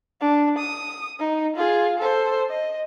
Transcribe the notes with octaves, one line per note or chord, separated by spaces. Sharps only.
D4
D#6
D#4
F4 G#4
A4 C5
D#5